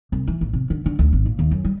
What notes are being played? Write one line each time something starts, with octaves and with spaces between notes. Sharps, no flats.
C2
E3
A1
C3
D3
D3
D2
G#1
A#2
D#2
F#2
G3